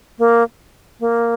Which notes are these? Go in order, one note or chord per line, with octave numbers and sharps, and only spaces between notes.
A#3
A#3